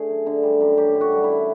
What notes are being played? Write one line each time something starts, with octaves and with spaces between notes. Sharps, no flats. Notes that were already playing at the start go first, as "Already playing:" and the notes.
Already playing: D3 A3 G#4
F#2
D3
G3
F#2
F#2 G4
D3
F#4
G3
F#2 E4